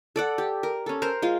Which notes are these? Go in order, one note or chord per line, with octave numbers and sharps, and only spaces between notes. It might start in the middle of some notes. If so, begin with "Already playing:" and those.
A4 D5 F#5
G4
A#4
C#4 A4
A#4 C5 A#5
G#3 F4